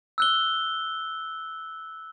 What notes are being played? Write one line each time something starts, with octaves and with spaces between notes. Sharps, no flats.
E6 F#6 G7